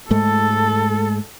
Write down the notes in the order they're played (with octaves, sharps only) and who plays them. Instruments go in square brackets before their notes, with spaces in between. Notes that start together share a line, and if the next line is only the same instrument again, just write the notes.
[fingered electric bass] G#2 G#3 A3 [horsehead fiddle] A4